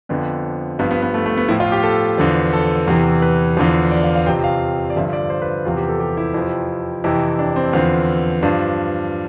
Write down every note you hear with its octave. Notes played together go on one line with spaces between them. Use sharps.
F2 D3 F3 B3
G2 F3 B3
B3
B3
A3
A3
B3
A2 F3 E4
F4
G4
A4
E2 D3 F3
A4
E2 C3 E3
B4
E2 D3 F3
D5
F5
F5
F2 C3 F3 G5
F5
D5
G2 D3 F3 E5
D5
C5
B4
E2 C3 F3 F4
G4
A4
G4
E4
F2 C3 F3 E4
F2 C3 E3 E4
D4
C4
E2 D3 F3
G2 F3 D4